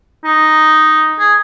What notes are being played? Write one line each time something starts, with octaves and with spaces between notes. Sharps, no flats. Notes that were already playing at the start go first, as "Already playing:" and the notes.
D#4
G#4